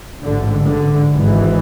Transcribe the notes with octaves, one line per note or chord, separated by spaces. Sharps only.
A1 G#2 D3
D3
G#1 G#2 E3